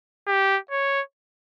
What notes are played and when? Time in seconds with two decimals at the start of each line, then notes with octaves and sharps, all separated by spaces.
0.27 G4
0.71 C#5